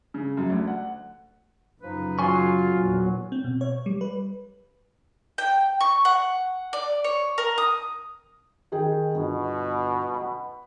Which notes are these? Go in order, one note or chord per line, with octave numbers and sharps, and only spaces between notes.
C#3
F#2
D2
F#5
F#2 C#3 F3 D#4 B4
F#3 F4 G#5 C#6
A#1 E2
C4
B2
C#5
G3
B4
G5
C#6
F#5
D5
C#5
A#4
D#6
D#3 G#4 G5
G1 B2
F#5 B5